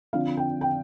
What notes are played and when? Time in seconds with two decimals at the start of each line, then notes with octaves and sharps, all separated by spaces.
0.13 D3 F3 C4 F5
0.37 G5
0.61 G5